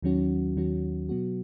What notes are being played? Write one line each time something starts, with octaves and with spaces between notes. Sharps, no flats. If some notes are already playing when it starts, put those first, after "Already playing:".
D#2 D#3 F#3 C#4 F#4
D#2 D#3 F#3 C#4 F#4
B2 F#3 B3 F#4